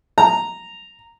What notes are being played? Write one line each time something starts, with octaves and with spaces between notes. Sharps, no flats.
A#5